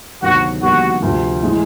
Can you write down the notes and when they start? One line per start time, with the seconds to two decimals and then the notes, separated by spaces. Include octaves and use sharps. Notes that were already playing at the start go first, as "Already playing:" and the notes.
0.22 D2 C3 D#3 F#3 B3 F#4
0.62 F1 D#2 D3 G3 B3 F#4
1.02 D2 C3 F3
1.42 A2 E3 G#3